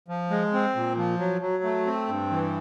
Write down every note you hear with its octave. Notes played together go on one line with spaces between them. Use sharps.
F3
G#3
C4
A#2
F3
F#3
F#3
A3
C4
G2
E3